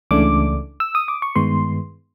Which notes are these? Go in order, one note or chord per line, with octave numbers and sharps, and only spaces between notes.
C#2 C#3 E3 A3 D4 D6
E6
D#6
D6
C#6
G2 D#3 G#3 B3 C6